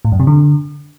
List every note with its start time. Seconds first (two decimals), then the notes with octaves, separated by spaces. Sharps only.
0.05 A2
0.12 F#2
0.20 C3
0.27 D3